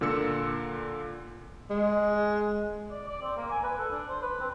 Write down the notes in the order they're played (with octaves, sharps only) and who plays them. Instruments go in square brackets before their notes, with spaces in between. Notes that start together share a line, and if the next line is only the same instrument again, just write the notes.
[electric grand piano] A#2 D3 A#3 E6 C#7
[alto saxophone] G#3
[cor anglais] D5
D5
C4
A#3
G#5
B4
A4
D4
C5
B4
C4